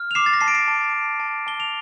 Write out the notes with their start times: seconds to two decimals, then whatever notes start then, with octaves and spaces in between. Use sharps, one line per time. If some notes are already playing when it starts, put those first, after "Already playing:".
Already playing: F6
0.11 F7
0.15 D6 C7 E7
0.26 A6
0.33 A#6
0.41 A5 C7
0.48 D7
0.55 C7 E7
0.68 A5
0.94 A5
1.20 A5
1.47 A5 G7
1.60 F7